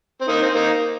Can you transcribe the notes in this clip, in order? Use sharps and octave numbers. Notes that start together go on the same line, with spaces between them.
C4
A#3 D#4
C4
A#3 D#4